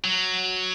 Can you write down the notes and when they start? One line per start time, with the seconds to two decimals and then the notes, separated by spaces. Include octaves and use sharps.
0.04 F#3